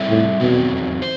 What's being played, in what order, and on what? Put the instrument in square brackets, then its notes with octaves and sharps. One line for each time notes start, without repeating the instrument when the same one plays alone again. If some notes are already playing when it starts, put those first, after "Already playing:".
Already playing: [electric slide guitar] G3 C4 E4 A4 E5
[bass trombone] A2
[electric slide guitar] E2 D#3 F#3 C4 E4 [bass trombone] B2
[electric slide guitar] C5